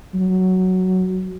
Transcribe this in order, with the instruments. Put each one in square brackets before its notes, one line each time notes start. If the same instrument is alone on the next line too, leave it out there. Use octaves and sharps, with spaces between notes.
[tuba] F#3